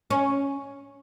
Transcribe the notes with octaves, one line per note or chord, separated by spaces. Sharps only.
C#4